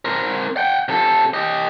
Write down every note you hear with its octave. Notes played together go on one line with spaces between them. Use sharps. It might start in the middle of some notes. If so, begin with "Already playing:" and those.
C4 A#4
F#5 G5
C3 A4
G4 D#5